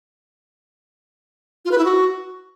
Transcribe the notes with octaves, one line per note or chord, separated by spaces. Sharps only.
F4
B4
E4
F#4